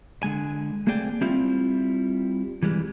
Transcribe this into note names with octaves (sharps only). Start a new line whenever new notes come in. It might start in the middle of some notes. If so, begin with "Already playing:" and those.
D3 G#3 G#5
A3 A#3 C4 G#4 D5 G5
G3 C4 E4 F4 E5
E3 G3 G#3